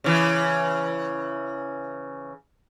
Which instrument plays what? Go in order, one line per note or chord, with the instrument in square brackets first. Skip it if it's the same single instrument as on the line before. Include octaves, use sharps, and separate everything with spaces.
[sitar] C#3 E3